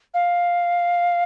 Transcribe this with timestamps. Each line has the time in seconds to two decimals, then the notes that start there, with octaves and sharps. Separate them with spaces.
0.14 F5